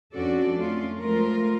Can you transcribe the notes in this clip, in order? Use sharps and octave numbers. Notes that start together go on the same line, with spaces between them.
F2 C#4 D4 F#4 A4 D5
A3 C#4 F4
F3 G#3 A3 F4 A#4